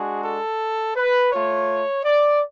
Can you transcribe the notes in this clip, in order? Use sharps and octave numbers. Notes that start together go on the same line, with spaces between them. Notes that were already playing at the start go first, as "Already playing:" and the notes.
Already playing: G#3 D4 F#4 G#4
A4
B4
A3 F4 C#5
D5